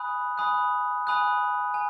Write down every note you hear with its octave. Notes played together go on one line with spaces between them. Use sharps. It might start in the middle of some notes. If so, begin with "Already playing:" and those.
Already playing: G#5 B5 D#6 F#6
G#5 B5 D#6 F#6
G#5 B5 D#6 F#6
G#5